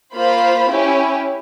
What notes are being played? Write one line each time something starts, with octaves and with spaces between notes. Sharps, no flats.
A#3 F4 C5 B5
C#4 E4 G4